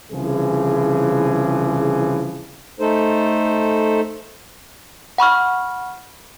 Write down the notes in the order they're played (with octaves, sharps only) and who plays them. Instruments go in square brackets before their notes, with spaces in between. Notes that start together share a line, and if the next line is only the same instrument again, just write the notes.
[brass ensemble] C2 C#3 E3 F3 G#4
[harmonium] A3 D#4 A4 C5
[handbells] F#5 B5 C#6 F6